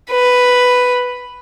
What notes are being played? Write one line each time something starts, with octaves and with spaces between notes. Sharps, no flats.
B4